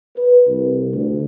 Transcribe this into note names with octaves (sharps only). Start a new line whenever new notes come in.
B4
C2
D2